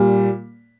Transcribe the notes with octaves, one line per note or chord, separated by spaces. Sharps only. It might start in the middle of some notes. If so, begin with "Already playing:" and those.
Already playing: A#2 G3